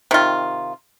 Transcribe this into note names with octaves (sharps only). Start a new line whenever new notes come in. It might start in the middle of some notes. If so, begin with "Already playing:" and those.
C3 D#3 F4